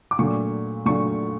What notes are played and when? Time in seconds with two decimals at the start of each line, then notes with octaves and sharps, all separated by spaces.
0.11 D6
0.19 A#2 F#3 A3 D4 C#6
0.86 A#2 F#3 A3 D4 C#6